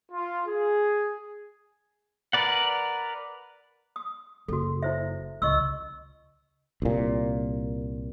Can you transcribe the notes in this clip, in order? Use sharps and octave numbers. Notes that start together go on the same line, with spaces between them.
F4
G#4
A#4 B4 D5 F#5
D#6
F#1 F#4 A4
E4 C5 E5
C#2 D#5 C#6 E6
C2 A#2